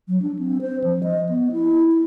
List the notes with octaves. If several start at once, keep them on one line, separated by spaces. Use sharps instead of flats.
F#3
D4
C4
C5
F3
D#5
B3
E4
E4